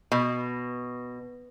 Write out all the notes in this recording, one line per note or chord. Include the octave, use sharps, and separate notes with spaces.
B2